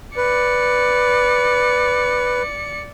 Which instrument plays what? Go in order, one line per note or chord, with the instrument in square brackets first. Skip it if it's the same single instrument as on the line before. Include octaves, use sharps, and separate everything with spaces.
[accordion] B4 [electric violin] D5 C#7